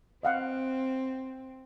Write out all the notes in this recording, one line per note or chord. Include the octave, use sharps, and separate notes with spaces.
C4 D#5 F5 F#5